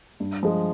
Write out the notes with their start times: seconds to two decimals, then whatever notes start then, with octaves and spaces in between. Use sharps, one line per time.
0.20 G2
0.43 F3 G#3